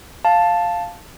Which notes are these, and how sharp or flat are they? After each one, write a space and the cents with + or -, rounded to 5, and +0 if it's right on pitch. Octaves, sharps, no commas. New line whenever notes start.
F5 +0 A5 +0